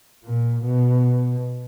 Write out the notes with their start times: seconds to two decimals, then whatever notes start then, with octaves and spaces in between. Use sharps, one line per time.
0.25 A#2
0.65 B2